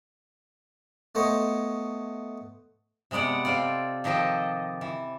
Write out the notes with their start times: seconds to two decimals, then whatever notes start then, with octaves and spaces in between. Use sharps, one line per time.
1.15 A3 B3 C5 C#5 D#5
3.11 C3 G#3 B3 D5 F#5
3.45 C4 F4 A4 D5
4.04 D#3 F3 G4 A4 D#5
4.81 E3